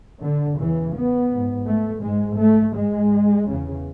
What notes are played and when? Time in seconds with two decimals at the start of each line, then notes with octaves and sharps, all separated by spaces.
0.22 D3
0.58 E2 C#3 E3
0.95 B3
1.31 G#2
1.67 A3
2.03 G#2 G#3
2.39 A3
2.75 G#2 G#3
3.47 E2 C#3